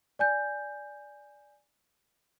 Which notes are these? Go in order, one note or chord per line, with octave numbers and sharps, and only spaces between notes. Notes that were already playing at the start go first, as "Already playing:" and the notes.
D5 G#5 G6